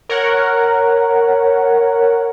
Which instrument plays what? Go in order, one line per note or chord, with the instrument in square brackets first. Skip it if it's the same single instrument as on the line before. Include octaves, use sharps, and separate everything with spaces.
[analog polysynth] A#4 C#5 F#5